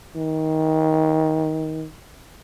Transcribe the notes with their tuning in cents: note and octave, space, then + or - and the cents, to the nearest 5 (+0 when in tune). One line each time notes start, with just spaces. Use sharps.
D#3 +20